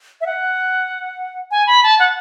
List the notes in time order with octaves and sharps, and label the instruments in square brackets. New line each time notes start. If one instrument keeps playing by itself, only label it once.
[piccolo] E5
F#5
G#5
B5
A5
F#5